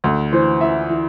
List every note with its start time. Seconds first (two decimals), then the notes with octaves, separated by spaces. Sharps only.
0.04 D2
0.32 E3 C5
0.61 E3 E5
0.89 E3